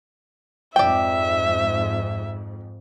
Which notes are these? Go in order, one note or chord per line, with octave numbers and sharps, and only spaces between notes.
F2 G#2 D5 E5 G5